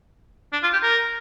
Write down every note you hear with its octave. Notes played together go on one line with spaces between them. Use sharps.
D4
F4
G4
A#4